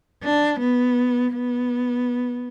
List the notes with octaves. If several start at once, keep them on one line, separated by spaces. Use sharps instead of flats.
D4
B3
B3